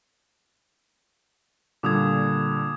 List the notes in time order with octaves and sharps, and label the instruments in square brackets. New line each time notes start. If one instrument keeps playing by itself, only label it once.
[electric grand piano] A#2 D3 G3 [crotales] D6 D#6 G#6